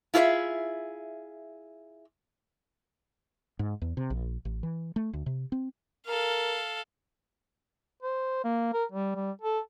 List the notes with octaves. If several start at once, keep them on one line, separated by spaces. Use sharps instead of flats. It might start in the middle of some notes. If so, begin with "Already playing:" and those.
E4 F4 G#4 C5 E5
G#2
E2
C3
A#1
A1
E3
A3
D2
C3
C4
A4 A#4 F5
C5
A#3
A#4
G3
G3
A4